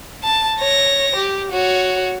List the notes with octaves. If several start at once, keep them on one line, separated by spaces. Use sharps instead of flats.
A5
C#5 A#6
G4
F#4 C#5